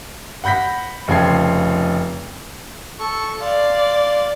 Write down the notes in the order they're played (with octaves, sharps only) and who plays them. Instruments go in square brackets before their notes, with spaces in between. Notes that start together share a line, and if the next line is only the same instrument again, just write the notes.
[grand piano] F#5 B5 G6 A#6 B6
F1 C#3 F3 G5 G#6 C7
[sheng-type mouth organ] A4 C#6
[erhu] D5 [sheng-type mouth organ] F5 C6